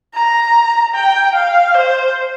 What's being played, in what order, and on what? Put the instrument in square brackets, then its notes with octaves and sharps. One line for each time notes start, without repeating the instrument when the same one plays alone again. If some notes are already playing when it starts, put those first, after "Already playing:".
[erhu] A#5
G5
F5
C5